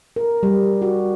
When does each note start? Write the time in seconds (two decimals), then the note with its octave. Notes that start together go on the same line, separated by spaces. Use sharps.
0.16 A#4
0.43 G3
0.82 F#4